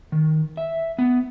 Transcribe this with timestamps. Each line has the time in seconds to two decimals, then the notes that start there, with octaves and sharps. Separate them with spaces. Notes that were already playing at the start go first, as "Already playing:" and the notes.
0.12 D#3
0.57 E5
0.98 B3